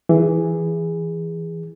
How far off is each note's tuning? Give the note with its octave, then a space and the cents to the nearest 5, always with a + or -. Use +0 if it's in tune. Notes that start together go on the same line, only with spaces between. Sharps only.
E3 +5 G#4 -15